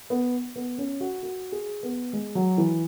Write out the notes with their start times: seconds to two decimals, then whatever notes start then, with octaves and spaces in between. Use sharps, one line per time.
0.10 B3
0.56 B3
0.78 C#4
1.00 F#4
1.23 F#4
1.52 G#4
1.83 B3
2.13 G#3
2.35 F#3
2.58 E3